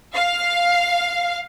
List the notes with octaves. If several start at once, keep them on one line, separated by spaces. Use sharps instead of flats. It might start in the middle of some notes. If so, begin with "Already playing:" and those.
F5